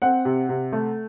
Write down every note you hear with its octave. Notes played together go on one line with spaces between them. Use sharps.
C4 F#5
C3
C3
A3